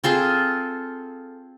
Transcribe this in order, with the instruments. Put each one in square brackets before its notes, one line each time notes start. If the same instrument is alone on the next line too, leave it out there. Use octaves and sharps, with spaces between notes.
[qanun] C4 F4 G#4 A4